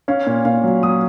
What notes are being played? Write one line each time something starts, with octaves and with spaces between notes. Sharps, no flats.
C#4 F5
A#2
A#2 F5
F#3
F#3 D#6